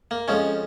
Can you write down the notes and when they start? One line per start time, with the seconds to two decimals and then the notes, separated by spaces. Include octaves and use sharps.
0.11 A#3
0.28 F2 F3 G#3 C#4